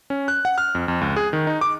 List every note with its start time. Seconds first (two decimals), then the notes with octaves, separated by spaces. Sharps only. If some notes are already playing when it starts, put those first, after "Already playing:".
0.10 C#4
0.28 F#6
0.45 F#5
0.58 F6
0.75 F2
0.88 F2
1.01 C#2
1.16 G#4
1.33 D#3
1.47 D#4
1.61 D6